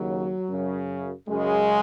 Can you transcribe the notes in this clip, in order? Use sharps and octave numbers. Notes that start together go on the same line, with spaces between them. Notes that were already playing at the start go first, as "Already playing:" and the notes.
Already playing: D#2 C#3 F#3
F#2 C#3
F#2 C#3 G#3